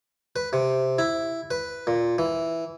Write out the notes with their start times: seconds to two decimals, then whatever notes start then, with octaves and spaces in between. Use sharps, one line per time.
0.36 B4
0.53 C3
0.98 E4
1.51 B4
1.87 A#2
2.18 E3